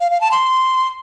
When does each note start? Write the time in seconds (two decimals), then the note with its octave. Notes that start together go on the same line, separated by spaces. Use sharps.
0.01 F5
0.11 F5
0.21 A5
0.31 C6